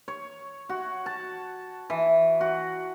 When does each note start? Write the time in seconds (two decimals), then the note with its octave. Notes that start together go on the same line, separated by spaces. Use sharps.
0.08 C#5
0.69 F#4
1.06 A5
1.90 E3
2.41 F#4